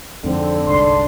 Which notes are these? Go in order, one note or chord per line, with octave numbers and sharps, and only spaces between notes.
F2 G#2 D3 C4
G1 C2 G#2 D4 C6